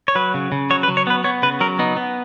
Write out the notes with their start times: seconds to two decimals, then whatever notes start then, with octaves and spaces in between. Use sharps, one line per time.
0.08 C#5
0.15 F#3 B4
0.34 C#3
0.52 C#3
0.70 F#3 C#5
0.83 B4
0.88 F#3
0.97 C#5
1.07 B3 B4
1.24 B3 C#5
1.43 C#3 B4
1.60 F#3 A#4
1.79 B3 D#4
1.97 B3